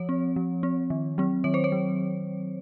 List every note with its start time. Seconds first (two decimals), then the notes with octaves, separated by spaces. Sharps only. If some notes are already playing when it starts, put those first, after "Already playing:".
Already playing: F3 C#5
0.09 C4
0.36 F3
0.63 C4
0.90 D#3
1.18 F#3 C4
1.44 D#3 C#5
1.54 C5
1.64 C#5
1.72 F#3